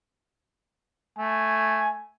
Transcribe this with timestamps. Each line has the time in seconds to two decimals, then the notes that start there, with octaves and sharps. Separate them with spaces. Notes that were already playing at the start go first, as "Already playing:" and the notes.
1.18 A3 G#5